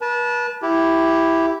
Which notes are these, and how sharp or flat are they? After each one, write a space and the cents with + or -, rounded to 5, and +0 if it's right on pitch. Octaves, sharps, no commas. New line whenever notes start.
B4 -40 A5 -20
E4 +0 G4 +0